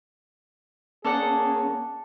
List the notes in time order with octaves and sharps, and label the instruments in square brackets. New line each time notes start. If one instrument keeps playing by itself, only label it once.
[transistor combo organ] A#3 C#4 [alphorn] G#4 [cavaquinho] A4 D5 F#5